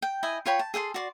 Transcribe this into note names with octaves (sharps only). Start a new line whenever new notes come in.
G5
E4 D#5 G#5
F4 C#5 G5 B5
A5
G#4 A4 G5 C6
F#4 D5 C6